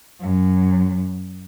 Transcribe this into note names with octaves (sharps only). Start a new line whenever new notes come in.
F#2